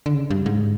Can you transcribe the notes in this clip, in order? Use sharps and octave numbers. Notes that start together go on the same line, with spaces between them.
D3
C#3
G2
G#2